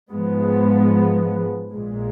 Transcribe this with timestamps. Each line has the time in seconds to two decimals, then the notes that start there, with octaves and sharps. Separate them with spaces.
0.11 G#2 F3 G#3 B3
1.72 A#1 A#2 G#3